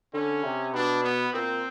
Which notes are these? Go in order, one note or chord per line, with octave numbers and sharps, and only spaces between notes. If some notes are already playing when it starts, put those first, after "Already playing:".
D3 C#4
C3
B2 D4
B3
A#2 C4